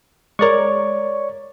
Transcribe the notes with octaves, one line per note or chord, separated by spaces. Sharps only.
G#3 A#4 C#5 D5 C#6